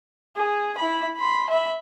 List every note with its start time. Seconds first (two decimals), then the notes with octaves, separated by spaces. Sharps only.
0.36 G#4
0.77 E4 B5
1.16 B5 C6
1.50 E5 B5